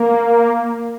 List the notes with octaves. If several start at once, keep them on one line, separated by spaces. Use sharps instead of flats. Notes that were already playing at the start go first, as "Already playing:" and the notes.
Already playing: A#3